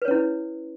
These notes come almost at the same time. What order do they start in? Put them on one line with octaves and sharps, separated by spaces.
B4 C#5 C#4 E4